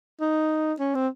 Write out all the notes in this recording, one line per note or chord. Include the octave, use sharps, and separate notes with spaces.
D#4
C#4
C4